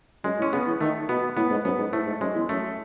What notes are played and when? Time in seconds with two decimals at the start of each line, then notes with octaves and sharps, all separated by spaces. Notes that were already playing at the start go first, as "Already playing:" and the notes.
0.24 F#2 G#3
0.39 A2
0.42 C#4
0.52 C#3 B3
0.66 E3
0.81 D#3 A3
1.09 B2 B3
1.37 A2 B3
1.50 G#2
1.64 F#2 B3
1.78 G#2
1.92 A2 A3
2.06 G#2
2.21 F#2 G#3
2.35 E2
2.49 F#2 A3